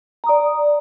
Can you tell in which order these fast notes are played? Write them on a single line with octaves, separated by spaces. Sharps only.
A#5 D#6 D5